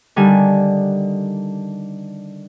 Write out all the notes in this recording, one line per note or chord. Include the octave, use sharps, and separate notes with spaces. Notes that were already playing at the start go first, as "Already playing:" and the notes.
D3 D#3 G3 G#5